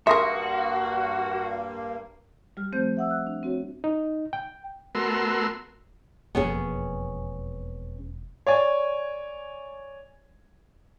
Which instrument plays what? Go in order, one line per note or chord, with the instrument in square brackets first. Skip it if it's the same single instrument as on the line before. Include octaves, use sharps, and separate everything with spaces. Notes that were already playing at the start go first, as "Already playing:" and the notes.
[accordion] G2 A#3 [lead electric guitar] F#4 [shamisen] A#4 E5 [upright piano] C6 D#6 A#6
[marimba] G3 G4 F6
F3 A3 C4 C5 G6
E5 F#5 E6
F#6
D4
C4 F#4 C#5
[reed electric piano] D#4
G5
[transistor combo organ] A3 B3 F#4 A#4 C6 E6
[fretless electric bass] E1 F2 A#3 [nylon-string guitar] B3 C#4 G#4
[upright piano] C#5 D5 G#5